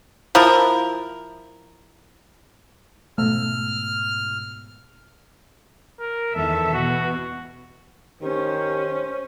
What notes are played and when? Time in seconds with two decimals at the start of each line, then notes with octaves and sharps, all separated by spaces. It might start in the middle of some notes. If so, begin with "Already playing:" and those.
0.35 F3 E4 A#4
3.18 G#2 B2 A3 E6 F6
5.99 A#4
6.35 E2 D#3 A4 E5
6.73 B2 F#4
8.21 D#3 C#4 G4 C5